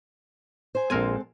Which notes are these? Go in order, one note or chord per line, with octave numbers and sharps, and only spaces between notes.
C5 G#5
A#1 G#3 C4 A4 A#4 G#5